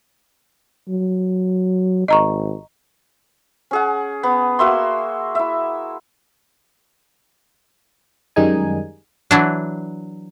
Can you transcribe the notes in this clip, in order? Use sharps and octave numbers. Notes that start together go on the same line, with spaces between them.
F#3
G#1 D#5 A#5 C#6
C#4 G#4 F#5
B3
A#3 F#4 E5 C6
E4 E5
F#2 D#3 G3 G#3 D#4 G#5
E3 F#3 D4